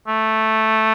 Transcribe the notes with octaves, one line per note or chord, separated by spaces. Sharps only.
A3